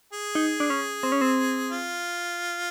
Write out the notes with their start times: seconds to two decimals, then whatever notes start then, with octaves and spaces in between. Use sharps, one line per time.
0.13 G#4
0.35 D#4
0.60 D4
0.70 C#4
1.03 C4
1.12 C#4
1.21 C4
1.71 F4